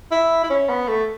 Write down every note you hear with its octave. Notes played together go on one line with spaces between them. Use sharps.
E4
E4
C#4
B3
A3